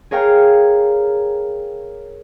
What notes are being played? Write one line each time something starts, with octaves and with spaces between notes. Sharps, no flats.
G#4 A#4 C#5 F5 G5 A#5